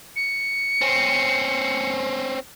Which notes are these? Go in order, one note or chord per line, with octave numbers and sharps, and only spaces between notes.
C#7
C4 C#4